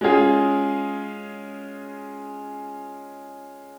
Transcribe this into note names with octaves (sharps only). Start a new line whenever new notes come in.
G#3 C#4 F4 G#4